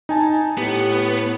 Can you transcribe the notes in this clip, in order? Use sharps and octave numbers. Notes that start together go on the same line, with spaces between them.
D#4 G#5 A5
A2 B3 G4